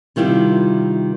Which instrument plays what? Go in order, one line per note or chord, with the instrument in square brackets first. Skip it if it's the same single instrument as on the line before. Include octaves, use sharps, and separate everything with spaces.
[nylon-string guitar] C3 D#3 G3 E4 F4